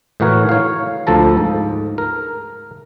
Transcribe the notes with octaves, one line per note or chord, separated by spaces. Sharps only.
A2 E3 F#4 A#4 C#5
C#5 F5
D2 F3 A4 A5 A#5
G#2
A#4